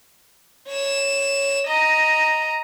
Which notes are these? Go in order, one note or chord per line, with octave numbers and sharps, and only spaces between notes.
C#5 E7
D#5 A#5